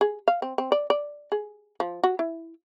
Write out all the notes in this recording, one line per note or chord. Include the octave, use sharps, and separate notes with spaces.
G#4
F5
C4
C4
D5
D5
G#4
F3
F#4
E4